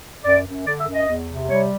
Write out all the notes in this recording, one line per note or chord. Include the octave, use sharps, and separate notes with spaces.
F#2 D5
F#2
D3 D5
E5
F#2
D#5
E2
C3
G3 C#5